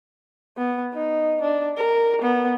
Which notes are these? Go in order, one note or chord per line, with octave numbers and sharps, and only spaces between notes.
B3
D#4
D4
A#4
B3